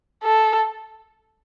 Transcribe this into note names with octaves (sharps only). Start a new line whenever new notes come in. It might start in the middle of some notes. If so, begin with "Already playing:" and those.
A4